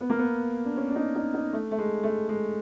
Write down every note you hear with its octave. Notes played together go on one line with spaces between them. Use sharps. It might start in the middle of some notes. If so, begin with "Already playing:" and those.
B3
A#3
B3
D4
C#4
D4
D#4
D#4
D#4
A3
A3
G#3
A3
G#3